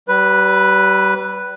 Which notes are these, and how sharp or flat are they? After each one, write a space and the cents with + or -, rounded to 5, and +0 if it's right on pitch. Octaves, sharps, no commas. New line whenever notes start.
G3 -35 B4 +0